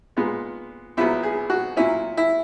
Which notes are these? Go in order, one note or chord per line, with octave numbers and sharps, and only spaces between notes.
A#2 G#3 B3
A#1 A#2 F#3 B3 E4
G#4
F#4
A#2 F#3 C#4 E4
E4